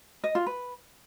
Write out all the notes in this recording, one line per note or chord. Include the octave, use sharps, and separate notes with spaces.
D#5
F4
B4